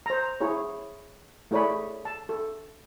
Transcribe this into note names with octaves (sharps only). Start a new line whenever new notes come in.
C5 A#5
E4 G#4 C#5
A3 E4 G#4 C#5 D5 B5
A5
A4